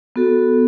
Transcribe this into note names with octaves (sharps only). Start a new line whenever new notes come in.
B3 F#4 A4